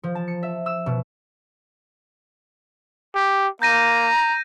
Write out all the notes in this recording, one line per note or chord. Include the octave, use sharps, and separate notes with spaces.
F3
A5
C#7
E5
E6
B2
G4
A#3 A#5 G6 A#6 D#7